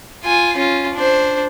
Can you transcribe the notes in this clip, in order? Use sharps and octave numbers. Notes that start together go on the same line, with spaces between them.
F4 G#5
C#4 F4
D4 C5